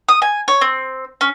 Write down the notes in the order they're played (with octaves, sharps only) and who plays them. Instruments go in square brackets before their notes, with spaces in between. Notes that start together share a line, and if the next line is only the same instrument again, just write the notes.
[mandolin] D#6
G#5
C#5
C4
C#4